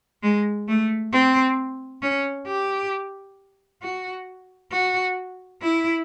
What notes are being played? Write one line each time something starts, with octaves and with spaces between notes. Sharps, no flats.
G#3
A3
C4
C#4
G4
F#4
F#4
E4